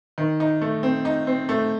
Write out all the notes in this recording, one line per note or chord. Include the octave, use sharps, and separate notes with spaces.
D#3
D#4
A3
C4
D#4
C4
A3